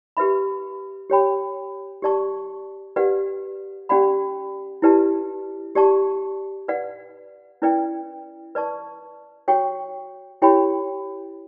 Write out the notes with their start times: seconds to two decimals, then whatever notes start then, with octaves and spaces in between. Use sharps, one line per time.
0.17 G4 B4 E5 B5
1.10 G4 C#5 G5 B5
2.02 G4 D5 A5 C#6
2.96 G4 B4 D5 F#5
3.89 C#4 G4 D5 F#5 B5
4.82 E4 G4 B4 D5 A5
5.75 G4 D5 A5 C#6
6.68 B4 D5 F#5
7.62 C#4 E4 B4 D5 G5
8.55 B4 D5 A5 C#6
9.48 F#4 C#5 G5 C#6
10.42 E4 G4 C#5 G5 B5